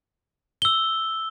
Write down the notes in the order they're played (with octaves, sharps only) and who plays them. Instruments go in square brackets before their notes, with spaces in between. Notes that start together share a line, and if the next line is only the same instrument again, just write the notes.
[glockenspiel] E6 G7